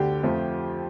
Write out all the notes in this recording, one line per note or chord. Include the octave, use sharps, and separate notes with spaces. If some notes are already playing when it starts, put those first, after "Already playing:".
Already playing: D2 D3 G4
F2 F3 A3